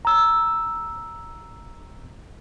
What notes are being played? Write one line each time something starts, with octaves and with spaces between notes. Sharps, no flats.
A#5 E6